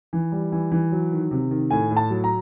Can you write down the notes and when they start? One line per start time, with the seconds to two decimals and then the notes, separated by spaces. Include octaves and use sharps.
0.13 E3
0.32 G3
0.52 E3
0.72 E3
0.92 F#3
1.12 D#3
1.31 C3
1.51 D#3
1.71 A2 G#5
1.90 A2
1.97 A5
2.10 F#3
2.24 A#5